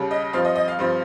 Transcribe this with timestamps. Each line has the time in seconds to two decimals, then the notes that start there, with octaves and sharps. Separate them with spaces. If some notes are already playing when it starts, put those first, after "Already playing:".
Already playing: D#2 C#3 G3
0.11 D#5
0.33 G2 F3 C4 F5
0.45 D#5
0.55 D#5
0.68 F5
0.79 G2 F3 C4